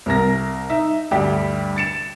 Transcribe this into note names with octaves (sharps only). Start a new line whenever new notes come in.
C2 A#4 A#6
D#4 E5
D2 G2 G3 G4
A6 C#7 E7